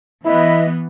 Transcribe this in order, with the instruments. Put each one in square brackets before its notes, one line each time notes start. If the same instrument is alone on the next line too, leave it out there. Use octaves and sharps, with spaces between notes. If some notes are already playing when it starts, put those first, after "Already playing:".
[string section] E3 B3 [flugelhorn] E4 [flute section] B4 D#5 E5